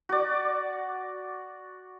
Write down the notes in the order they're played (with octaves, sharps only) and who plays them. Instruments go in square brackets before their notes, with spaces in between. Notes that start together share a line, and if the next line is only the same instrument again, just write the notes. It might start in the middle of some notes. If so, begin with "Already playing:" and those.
[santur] F#4 D5